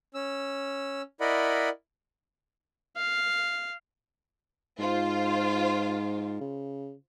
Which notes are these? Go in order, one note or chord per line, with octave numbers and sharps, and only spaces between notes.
C#4 E6
E4 A#4 D5 D#5 F#5 B5
F5
G#2 F4 C5
C#3